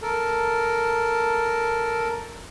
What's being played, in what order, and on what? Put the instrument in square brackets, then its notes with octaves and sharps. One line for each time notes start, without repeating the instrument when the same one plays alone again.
[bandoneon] A4 A#4